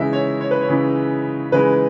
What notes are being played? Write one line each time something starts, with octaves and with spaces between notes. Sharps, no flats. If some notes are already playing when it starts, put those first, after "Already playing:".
Already playing: C#3 E3 G#3 D#4 E5
C#5
C#5
B4
C#5
C#3 E3 G#3 D#4
C#3 E3 G#3 D#4 B4